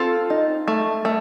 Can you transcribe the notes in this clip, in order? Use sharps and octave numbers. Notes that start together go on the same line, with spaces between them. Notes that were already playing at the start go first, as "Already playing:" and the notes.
Already playing: C4 F4 A4
D#4
A3
A3